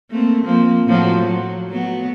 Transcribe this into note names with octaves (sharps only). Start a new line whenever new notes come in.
A3 A#3 C4
F3 A#3 C4
A2 F3 F#3
F#3
F#3 A3 B3